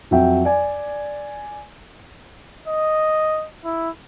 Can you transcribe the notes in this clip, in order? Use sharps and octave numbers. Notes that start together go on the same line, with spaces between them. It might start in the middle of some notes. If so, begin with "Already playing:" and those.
F2 F#3 E5 G5
D5 G#5
D#5
E4